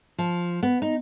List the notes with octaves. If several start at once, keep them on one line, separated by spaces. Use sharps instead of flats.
F3
B3
D#4